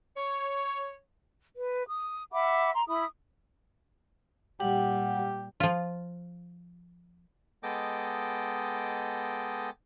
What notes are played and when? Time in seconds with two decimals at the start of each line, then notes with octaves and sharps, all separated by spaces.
0.17 C#5
1.56 B4
1.87 D#6
2.32 E5 F#5 B5 D6
2.74 A#5 C6
2.88 E4 E5 B5 D#6
4.60 A#2 G3 G4 F#5
5.60 F3 F4
7.63 G#3 B3 A4 D#5 G5 D6